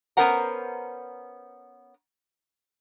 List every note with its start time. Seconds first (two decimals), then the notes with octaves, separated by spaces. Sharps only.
0.17 B3 C#4 A#4 C5 F#5 A#5